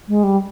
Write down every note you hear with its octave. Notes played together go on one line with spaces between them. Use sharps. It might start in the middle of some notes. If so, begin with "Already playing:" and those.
G#3
G3